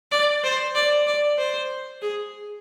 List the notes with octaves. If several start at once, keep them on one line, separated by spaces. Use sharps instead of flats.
D5
C5
D5
D5
C5
G#4